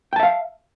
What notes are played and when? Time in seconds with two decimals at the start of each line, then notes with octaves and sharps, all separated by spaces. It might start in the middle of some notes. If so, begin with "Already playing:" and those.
0.13 G5
0.16 A5
0.20 E5
0.23 F5